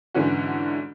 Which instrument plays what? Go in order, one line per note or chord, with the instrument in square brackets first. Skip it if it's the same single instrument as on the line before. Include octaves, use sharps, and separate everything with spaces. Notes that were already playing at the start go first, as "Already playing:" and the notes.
[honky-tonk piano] G#2 D3 E3 C#4 F#4